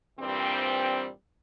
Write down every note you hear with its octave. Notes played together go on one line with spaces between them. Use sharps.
G2 A#2 E3 G3 C4